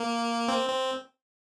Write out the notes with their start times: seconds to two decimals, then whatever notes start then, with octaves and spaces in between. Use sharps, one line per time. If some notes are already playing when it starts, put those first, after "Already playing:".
Already playing: A#3
0.48 C4
0.69 C4